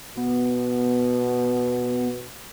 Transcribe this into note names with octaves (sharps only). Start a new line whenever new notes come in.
B2 B3